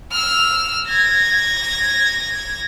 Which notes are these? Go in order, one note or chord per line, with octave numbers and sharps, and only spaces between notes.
E6 F6
G#6 A#6